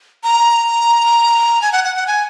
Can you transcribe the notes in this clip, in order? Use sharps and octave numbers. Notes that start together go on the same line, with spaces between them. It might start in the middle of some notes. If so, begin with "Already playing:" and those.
A#5
G#5
F#5
F#5
F#5
G#5